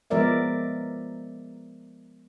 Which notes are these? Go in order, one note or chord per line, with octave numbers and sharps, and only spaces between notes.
F3 G#3 B3 A#4 D5 E5